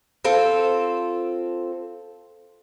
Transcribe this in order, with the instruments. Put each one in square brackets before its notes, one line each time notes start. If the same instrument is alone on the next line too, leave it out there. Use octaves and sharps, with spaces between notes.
[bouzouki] C4 F4 A4